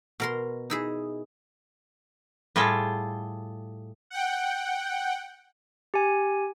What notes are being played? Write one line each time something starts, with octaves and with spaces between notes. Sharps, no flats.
B2 A#4 C6
D#4 E4 G#4
A2 G3 F4 G#4 A4
F#5 G5
G4 G#5